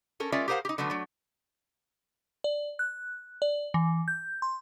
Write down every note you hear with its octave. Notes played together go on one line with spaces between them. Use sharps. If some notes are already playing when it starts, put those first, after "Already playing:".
C#4 A4 A#4
G#3 C#4 F4 A#4 D5 E5
G4 G#4 A#4 C5 F5 F#5
D#4 G4
D3 F#3 A3 B3
F#3 A3
D5
F#6
D5
E3
G6
C6